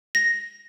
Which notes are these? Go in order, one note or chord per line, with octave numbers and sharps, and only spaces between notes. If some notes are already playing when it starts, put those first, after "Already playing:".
A#6